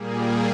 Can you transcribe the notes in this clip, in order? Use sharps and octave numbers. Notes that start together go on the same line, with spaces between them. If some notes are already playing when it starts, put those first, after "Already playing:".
Already playing: A#2 G3 A#3 G#4